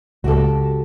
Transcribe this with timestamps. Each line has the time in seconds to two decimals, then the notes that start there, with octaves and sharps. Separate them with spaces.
0.24 C#2 F#4 G4 A4